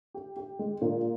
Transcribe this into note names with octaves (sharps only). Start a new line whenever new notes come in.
G4
G4
G#3
A#2